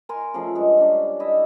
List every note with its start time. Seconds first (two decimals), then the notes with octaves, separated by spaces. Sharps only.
0.09 A#4 G#5 C6
0.34 C#3 F3 A3
0.55 G2 G#3
0.77 C#4 D4
1.20 E4 D#5 E5